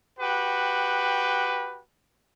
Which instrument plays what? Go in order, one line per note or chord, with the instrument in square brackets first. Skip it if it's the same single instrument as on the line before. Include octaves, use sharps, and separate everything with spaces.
[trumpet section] F#4 G4 B4 G5